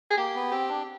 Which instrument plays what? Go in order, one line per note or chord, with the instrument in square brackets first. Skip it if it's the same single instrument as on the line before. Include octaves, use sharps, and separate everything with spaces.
[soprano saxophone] G#4
[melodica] A#3 [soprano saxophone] G4
[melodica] B3
[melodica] C4 [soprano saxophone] G4
[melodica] D4